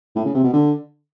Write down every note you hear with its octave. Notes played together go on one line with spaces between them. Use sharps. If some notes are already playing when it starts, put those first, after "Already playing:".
A2
C#3
C3
B2
D3